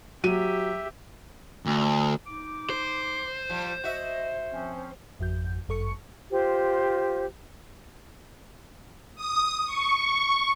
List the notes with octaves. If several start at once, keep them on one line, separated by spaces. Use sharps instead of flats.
F#3 G4 E5 D#7
D2
D#4 D6
C5
F3 G3
F#4 D#5 E5
F3 C4 C#4
G#1 F2 F#4 G6
G1 F#2 A4 C#6 C#7
F4 G4 C5
D#6
C#6